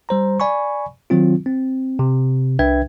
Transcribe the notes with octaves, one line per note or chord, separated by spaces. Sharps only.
G3 C5 A#5
D5 G#5 B5 C#6
D#3 F#3 C4 F4
C4
C3
C2 D4 B4 E5 G5 G#6